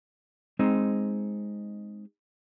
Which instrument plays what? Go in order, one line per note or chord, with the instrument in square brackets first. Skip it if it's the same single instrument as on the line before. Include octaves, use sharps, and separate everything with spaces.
[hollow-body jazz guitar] G#3 C4 D#4